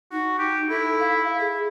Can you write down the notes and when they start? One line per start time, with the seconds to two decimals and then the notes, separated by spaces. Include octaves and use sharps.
0.12 D#4 F#4
0.39 G4
0.70 E4 A4
1.00 F5
1.40 G#4